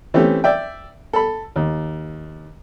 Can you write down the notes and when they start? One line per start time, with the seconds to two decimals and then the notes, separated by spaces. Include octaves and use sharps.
0.14 E3 A3 C4 C#4 E4 G4
0.44 D5 E5 G5
1.13 A4 B5
1.56 D#2